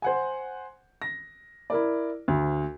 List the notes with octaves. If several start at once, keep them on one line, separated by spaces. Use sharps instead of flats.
C5 F#5 G#5
A#6
E4 A#4 D5
D2